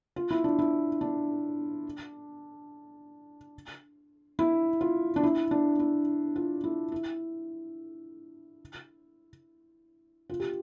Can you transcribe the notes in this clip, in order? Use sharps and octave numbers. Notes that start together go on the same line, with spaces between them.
F4
E4
D4
E4
D4
E4
F4
D4
E4
D4
E4
F4
E4
E4
F4
G4